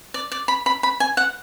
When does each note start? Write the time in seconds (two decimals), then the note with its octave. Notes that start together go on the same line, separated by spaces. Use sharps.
0.14 D5
0.32 D5
0.48 B5
0.66 B5
0.83 B5
1.00 G#5
1.17 F#5